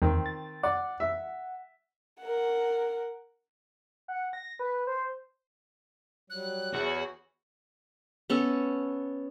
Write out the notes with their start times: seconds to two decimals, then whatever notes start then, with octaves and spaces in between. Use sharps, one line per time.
0.02 E2 D#3 C4
0.26 A6
0.63 D5 F#5
1.00 E5
2.22 A#4 F#5
4.08 F#5
4.33 A#6
4.59 B4
4.87 C5
6.30 F#3 G3 F#6
6.74 E2 E4 F#4 G#4 C#5
8.30 B3 C#4 A4